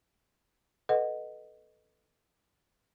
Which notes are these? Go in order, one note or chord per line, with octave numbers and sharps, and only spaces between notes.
A4 B4 D#5 F#5